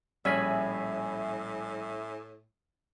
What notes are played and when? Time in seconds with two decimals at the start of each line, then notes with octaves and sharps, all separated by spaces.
0.25 A#1 A2 G3 C#4 G#4 E5 G#5 B5